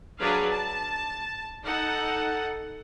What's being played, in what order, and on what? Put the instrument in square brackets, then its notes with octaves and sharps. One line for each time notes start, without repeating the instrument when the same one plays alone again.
[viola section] F#3 D4 G#4 B4 F5
A5
D#4 A4 F#5